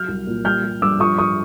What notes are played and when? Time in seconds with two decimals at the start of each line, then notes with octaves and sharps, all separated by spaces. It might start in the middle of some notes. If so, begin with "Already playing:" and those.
Already playing: F#3 F6 G6
0.08 C2
0.27 A#2
0.45 G3 F6 G6
0.64 G3
0.82 G2 D6 E6
1.00 F3 C#6 D#6
1.18 F3 C#6 D#6